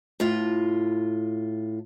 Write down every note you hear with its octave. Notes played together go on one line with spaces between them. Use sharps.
A2 F4